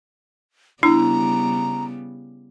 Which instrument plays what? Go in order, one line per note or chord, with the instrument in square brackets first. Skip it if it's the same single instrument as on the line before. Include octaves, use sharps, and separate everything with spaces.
[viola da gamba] C#3 G3 B3 [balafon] D4 [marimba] E4 [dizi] A#5